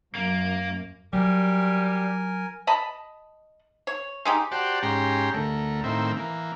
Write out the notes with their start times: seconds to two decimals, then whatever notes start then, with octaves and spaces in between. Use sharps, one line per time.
0.15 F#2 A#3
1.13 F#3 G3 A#4 G#5
2.67 D#5 A5 B5
3.87 C#5
4.25 G#3 D#4 G4
4.51 F#4 G4 C5 D5 A5
4.83 G#2 C#4 G4 A#5 C6
5.34 D2 A3 A#4
5.84 A2 D#3 A#3 C4 E4
6.17 E3 A#3